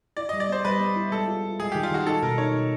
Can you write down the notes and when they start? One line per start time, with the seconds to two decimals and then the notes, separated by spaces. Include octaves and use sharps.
0.17 E4 D5
0.29 D#5
0.33 G3
0.40 D5
0.49 B3 C5
0.65 G3 B4
0.80 B3
0.96 E4
1.12 G#3 A4
1.27 F4
1.44 F4
1.60 G#3 G#4
1.72 G4
1.75 D#3
1.83 F4
1.91 D#3 F#4
2.07 D#4 A4
2.23 B2 A#4
2.38 D#4 C#5
2.54 B2